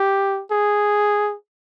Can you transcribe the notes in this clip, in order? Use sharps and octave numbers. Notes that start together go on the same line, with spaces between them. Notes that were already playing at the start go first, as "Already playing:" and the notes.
Already playing: G4
G#4